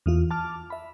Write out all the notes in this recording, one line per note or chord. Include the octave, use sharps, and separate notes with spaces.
E2 E3 F4
A5 D6 F6
E5 B5